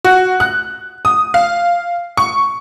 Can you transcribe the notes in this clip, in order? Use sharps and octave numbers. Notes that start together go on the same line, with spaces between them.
F#4
F#6
D#6
F5
C#6